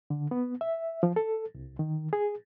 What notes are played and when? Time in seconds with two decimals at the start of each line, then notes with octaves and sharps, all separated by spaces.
0.10 D3
0.31 B3
0.61 E5
1.03 F3
1.16 A4
1.55 C2
1.79 D#3
2.13 G#4